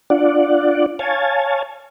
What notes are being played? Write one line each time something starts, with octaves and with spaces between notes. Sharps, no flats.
D4 F4 D5 F#5
C#5 F5 G#5 A5